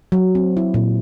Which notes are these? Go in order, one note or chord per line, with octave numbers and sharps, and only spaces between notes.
F#3
C4
E4
A#2